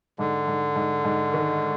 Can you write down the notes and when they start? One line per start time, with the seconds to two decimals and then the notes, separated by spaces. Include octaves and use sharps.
0.19 G#2 D3
0.48 G#2
0.76 G#2
1.05 G#2
1.34 D#3